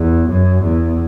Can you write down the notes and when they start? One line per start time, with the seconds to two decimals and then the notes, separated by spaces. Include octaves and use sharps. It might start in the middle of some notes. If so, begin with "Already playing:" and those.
Already playing: E2
0.28 F#2
0.63 E2